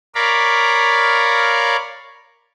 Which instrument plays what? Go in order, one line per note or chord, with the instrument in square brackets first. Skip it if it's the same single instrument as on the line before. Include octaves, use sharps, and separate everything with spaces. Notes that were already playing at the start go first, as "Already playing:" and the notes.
[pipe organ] A#4 C#5 D5 F5 A#5 B5